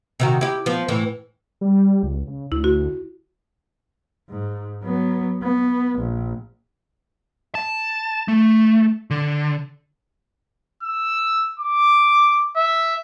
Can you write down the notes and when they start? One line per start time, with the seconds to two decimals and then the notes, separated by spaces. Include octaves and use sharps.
0.20 C3 D#3 F#4
0.41 E4 G4
0.66 F3 B3
0.88 A2 E3
1.61 G3
2.03 C#2
2.27 C#3
2.52 D2 E4
2.64 F#4
4.29 G#2
4.84 F#3 B3
5.42 B3
5.99 A#1
7.55 A5
8.28 A3
9.11 D3
10.83 E6
11.59 D6
12.56 E5